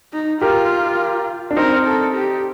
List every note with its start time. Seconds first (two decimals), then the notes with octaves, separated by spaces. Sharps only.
0.13 D#4
0.41 F4 G4 A#4
1.51 D4
1.57 C4 D#4 A#4
1.86 A4
2.14 G4